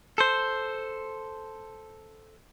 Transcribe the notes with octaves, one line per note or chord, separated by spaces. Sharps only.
A4 C5